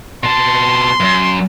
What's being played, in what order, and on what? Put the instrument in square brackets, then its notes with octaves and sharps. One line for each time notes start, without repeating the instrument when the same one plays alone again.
[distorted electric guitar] B2 A5 [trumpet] C6
[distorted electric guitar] F#2